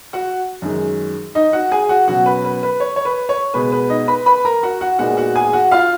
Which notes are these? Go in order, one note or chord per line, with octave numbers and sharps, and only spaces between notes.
F#4 F#5
F#2 D#3 G#3
D#4 D#5
F#4 F#5
G#4 G#5
F#4 F#5
B2 F#3 C#4 F#4 F#5
B4
B4
B4
C#5
C#5
B4
C#5
B2 G#3 B3 B4
B4
D#4 D#5
B4 B5
B4 B5
A#4 A#5
F#4 F#5
F#4 F#5
A#2 G#3 B3 D#4 F#4 F#5
F#4 F#5
G#4 G#5
F#4 F#5
F4 F5